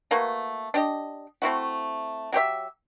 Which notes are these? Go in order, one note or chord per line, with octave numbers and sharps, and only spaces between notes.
A3 A#3 F#4 B4
D4 G4 D#5
A3 C4 E4 F#4
F#3 G4 C5 E5